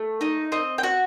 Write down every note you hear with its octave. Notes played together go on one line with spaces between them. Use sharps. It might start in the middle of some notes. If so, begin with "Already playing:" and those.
Already playing: A3
D#4 D#5
C4 D#5
G5
F#4 F#5